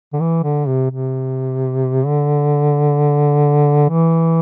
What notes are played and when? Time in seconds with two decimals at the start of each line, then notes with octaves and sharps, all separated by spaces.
0.13 D3
0.20 E3
0.43 D3
0.67 C3
0.90 C3
2.05 D3
3.89 E3